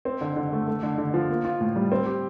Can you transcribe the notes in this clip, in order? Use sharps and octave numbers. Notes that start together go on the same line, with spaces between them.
C4
D3
D3
A3
A3
D3
D3
F3
A#3
F4
A2
G3
C4
G4